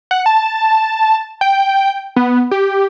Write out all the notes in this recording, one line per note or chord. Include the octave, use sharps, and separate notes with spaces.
F#5
A5
G5
B3
G4